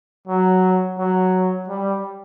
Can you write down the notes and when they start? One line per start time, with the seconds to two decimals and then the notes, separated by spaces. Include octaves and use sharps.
0.28 F#3
0.98 F#3
1.68 G3